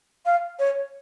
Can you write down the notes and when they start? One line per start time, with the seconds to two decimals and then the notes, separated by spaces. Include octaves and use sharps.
0.26 F5
0.59 C#5